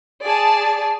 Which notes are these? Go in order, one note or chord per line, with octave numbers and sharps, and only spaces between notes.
G#4 D5 A5